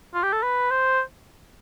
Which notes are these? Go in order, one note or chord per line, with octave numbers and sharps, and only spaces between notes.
F4
G4
A4
B4
C5